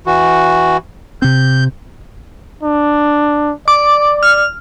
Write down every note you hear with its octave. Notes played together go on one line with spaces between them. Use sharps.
E3 F#4
C3 C4 G6
D4
D5 D6
F6